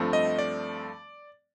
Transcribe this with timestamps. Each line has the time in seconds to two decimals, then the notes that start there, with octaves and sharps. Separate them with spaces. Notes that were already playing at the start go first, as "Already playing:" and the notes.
Already playing: G2 F3 A3 C4
0.13 D#5
0.39 D5